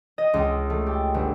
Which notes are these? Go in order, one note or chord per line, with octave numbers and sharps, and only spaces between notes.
D#5
C#2
A3
G4
G1